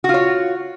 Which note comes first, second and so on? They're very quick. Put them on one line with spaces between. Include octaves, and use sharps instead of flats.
F#4 F4 C#5